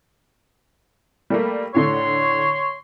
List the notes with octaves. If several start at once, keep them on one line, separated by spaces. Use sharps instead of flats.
G3 A3 A#3
A2 D3 A3 C#5 C6